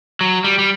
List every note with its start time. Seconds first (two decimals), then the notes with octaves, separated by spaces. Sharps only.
0.21 F#3
0.44 G3
0.59 G3